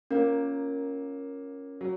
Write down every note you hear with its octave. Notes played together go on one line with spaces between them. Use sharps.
A#3 C#4 F4 A#4 C#5
F#3